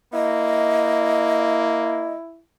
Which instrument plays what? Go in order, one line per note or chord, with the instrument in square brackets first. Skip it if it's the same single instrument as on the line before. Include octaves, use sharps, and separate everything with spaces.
[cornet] A#3 [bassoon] E4 [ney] D#5